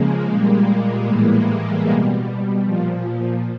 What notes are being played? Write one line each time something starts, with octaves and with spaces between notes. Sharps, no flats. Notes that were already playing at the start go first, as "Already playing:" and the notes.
Already playing: C#3 F3 G#3 A#3
A#2 G3
A2 E3 G3
B2 G3
A#2 F3